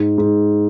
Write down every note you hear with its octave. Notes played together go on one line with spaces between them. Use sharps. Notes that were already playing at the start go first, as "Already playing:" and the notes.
Already playing: G#2
G#2